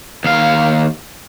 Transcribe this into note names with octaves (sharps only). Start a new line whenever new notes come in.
D#2 F5